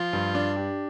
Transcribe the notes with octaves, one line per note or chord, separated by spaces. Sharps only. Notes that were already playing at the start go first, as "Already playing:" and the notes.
Already playing: F3 F4
G2
D4
G4